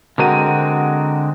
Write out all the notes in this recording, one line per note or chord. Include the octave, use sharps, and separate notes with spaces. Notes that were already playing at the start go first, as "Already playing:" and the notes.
D3 G#3 C4 F#4 A#4 D#7